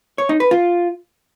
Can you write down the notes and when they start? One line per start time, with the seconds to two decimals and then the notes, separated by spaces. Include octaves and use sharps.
0.18 C#5
0.29 D#4
0.40 B4
0.51 F4